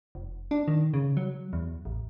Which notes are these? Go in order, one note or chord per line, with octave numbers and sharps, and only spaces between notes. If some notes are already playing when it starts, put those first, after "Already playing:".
F1
D4
D#3
C#3
F#3
E2
A1